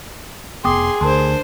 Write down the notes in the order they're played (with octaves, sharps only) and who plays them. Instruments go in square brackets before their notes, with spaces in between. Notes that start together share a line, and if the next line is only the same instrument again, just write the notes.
[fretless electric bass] F1 B3 [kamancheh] G#4 [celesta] G5 D6 D#6 [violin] C6
[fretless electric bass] D2 D3 [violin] D4 C5 [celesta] A#4 A5 C6